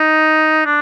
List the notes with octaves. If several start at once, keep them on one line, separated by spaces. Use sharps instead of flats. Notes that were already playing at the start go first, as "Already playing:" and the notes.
Already playing: D#4
D4